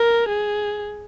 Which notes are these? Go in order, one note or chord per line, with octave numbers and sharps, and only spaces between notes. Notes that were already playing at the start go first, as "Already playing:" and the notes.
Already playing: A#4
G#4